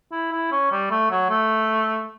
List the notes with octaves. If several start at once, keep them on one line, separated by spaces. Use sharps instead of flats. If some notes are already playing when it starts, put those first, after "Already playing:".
E4
E4
C#4
G3
A3
F#3
A3